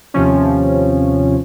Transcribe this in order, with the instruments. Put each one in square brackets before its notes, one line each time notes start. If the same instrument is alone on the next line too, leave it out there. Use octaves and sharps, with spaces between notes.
[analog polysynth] D#2 C3 F3 C#4